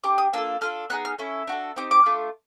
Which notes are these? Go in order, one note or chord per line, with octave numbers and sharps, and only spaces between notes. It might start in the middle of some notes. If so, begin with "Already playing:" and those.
D4 G4 D6
D#6
A#3 D4 F4 A4 E6
D4 F4 A4 F6
B3 D#4 G#4 F#6
F6
C#4 E4 A4
D4 F#4 A4
C4 D#4 G4 D6
D6
A3 D4 F4